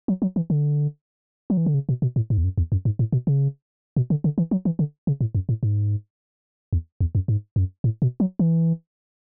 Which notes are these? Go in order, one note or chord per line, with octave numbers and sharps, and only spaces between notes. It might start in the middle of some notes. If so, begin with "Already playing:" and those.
F#3
F#3
E3
D3
F#3
E3
D3
C#3
B2
B2
A2
G#2
E2
F#2
E2
F#2
G#2
A2
B2
C#3
B2
D3
D3
E3
F#3
E3
D3
C#3
A2
F#2
A2
G#2
E2
E2
F#2
G#2
F#2
A2
B2
F#3
E3